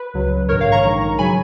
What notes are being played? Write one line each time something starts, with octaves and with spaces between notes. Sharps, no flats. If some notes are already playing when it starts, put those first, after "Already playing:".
Already playing: B4
C#2 C#3 F#3
A#1 G#2 D#3 A#4 C#5
C#5 F5
A#5 C#6
A#1 G#2 D#3
C#3 F#3 G#5 B5